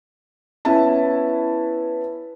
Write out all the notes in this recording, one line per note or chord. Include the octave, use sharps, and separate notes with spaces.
B3 C#4 E4 B4 E5 A5